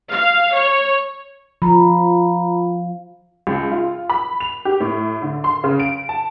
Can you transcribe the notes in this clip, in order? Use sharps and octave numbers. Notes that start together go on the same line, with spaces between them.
F5
C#5
F3 A#5 B5
C#2
F4
B5
F7
G4
A2
D3
C6
C#3
D7
A5